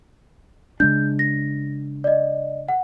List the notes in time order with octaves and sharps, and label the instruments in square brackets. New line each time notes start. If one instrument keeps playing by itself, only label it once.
[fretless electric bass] C#3 G#3 D4 [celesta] G6
[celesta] A#6
D5 D#5
F#5